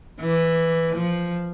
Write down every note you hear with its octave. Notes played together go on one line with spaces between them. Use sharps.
E3
F3